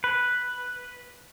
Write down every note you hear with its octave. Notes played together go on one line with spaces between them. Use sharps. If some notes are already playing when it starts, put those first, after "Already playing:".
B4